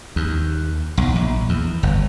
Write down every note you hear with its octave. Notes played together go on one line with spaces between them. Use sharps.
D#2
B1
A#1
E2
G1